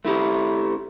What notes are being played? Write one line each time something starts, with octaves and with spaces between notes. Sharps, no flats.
A3 E4 G4